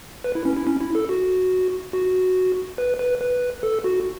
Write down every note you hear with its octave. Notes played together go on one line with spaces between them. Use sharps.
B4
E4
C#4
E4
C#4
E4
A4
F#4
F#4
B4
B4
B4
A4
F#4